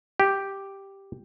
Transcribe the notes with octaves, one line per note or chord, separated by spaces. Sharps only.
G4